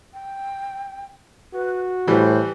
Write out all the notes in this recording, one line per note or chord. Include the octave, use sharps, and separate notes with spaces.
G5
F#4 B4
A2 E3 G3 C5